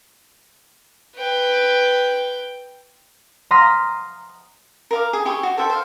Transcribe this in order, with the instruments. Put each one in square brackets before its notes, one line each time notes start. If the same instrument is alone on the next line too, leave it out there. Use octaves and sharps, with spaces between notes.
[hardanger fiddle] B4 G5
[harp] A#5 C6 D#6 F6 A#6 B6
[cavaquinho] A#4 F5 D6
G#4
E4 G4 G#4 C#6
F#4
A4 C5 E5 G5
C5 F5